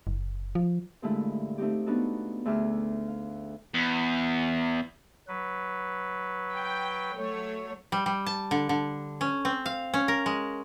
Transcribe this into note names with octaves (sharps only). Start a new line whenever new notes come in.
F#1
F3
G2 A#2 D3 G#3 A3 E4
A3 C4 D#4 G4
B3 D4 D#4 F#4 A4
D2 A3 G#4 E5 D6 F6
F5
E2
F#3 B4
G5
F#3 A3 C#5
G3
G3
A5
D3
D3
C#4
C4
F5
C#4
A#4
G#3